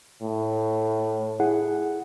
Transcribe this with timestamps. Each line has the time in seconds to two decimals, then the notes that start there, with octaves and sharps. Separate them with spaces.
0.22 A2
1.40 E4 G#4 F#5